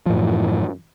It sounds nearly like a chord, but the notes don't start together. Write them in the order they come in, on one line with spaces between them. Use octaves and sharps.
F3 A2 F#2 E3